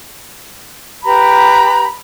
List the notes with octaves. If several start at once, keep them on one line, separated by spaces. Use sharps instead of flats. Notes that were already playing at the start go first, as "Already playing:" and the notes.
G4 B4 A#5 B5